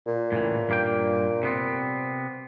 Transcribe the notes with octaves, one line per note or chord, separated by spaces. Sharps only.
A#2
A2 C#3 E3
G2 A#3 G5
C3 B3 C4